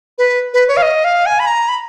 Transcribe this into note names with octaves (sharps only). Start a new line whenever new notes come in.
B4
B4
C#5
F5
D#5
F5
G#5
B5
A#5
B5